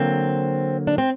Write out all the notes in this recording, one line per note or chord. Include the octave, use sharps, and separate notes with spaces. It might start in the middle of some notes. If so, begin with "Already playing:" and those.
Already playing: D3 F#3 A#3 C4
D4
C4